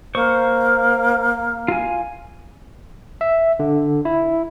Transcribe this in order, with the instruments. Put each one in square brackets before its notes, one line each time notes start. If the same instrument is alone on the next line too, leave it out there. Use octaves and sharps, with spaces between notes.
[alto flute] A#3 [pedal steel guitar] C5 C#6
[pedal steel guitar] F4 G#5
[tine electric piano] E5
D3
E4